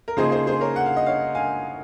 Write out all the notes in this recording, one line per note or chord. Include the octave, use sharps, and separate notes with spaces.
A#4
C#3 F3 A#3 D#4 G#4 C5
G#4 C5
G#4 C5
A#4 C#5
F#5
F5
D#5
C#5 F5
F5 G#5